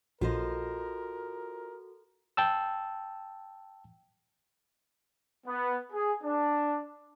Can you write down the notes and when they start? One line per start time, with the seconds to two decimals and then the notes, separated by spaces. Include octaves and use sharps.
0.21 A#1 F4 F#4 A4 A#4 C5 D#5
2.37 G5 A5 E6
5.46 B3
5.93 G#4
6.24 D4